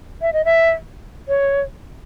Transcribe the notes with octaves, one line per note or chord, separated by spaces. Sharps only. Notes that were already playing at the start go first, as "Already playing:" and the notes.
E5
D#5
E5
C#5